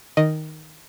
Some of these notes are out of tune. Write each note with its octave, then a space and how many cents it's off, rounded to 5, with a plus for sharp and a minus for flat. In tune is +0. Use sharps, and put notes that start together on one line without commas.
D#3 +0 D#5 +0